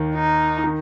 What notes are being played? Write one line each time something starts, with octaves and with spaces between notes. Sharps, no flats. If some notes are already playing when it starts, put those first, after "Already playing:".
Already playing: D#2 D#3
D#4
D#3